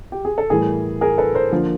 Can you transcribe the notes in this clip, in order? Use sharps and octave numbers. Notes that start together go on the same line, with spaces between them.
G4
G#4
A4
A2 E3 G3 G#4 A#4
G#4 A#4
A4 B4
A#4 C5
D3 F3 A#3